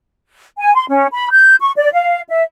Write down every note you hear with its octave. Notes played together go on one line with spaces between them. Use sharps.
G#5
C6
C#4
B5
G6
C#6
D5
F5
E5